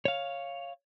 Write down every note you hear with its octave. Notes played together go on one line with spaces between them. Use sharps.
C#5 F5